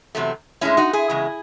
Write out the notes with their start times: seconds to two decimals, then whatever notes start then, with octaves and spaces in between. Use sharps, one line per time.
0.15 E2 C3 F#3 A3
0.61 A2 G#3 C#4 E4
0.77 D#4 F#4
0.93 E4 G#4
1.09 E2 C#3 G#3